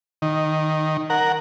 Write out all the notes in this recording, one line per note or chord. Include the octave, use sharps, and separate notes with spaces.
D#3
A#4 F#5